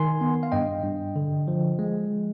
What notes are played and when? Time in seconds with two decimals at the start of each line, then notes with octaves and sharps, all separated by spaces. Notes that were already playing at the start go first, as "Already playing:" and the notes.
Already playing: D#3 G#5 C6
0.21 B3
0.43 F5
0.52 G2 D#5 G5
0.84 G2
1.16 D3
1.48 F3
1.79 G#3